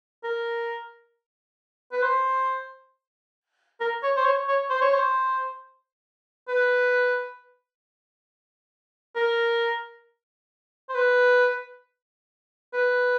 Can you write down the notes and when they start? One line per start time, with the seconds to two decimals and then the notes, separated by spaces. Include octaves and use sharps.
0.24 A#4
1.92 B4
2.02 C5
3.80 A#4
4.03 C#5
4.17 C5
4.25 C#5
4.48 C#5
4.70 C5
4.81 C#5
4.94 C5
6.48 B4
9.16 A#4
10.89 C5
10.95 B4
12.73 B4